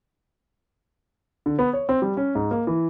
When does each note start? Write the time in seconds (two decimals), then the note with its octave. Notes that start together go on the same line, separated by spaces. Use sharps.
1.46 D3
1.59 B3
1.73 C#5
1.89 C4
2.02 G3
2.17 C#4
2.35 G#2
2.51 A#3
2.67 E3